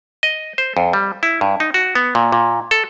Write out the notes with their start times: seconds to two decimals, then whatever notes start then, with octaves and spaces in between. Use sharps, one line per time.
0.23 D#5
0.58 C5
0.77 F2
0.93 G3
1.23 E4
1.41 G2
1.60 D#4
1.74 F#4
1.95 B3
2.15 A#2
2.32 A#2
2.71 A4